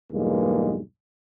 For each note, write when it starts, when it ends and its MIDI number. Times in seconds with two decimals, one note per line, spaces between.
0.12 0.79 35
0.12 0.79 40
0.12 0.79 43
0.12 0.79 56
0.12 0.79 58